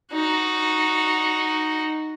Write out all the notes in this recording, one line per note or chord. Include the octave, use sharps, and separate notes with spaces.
D#4 F#4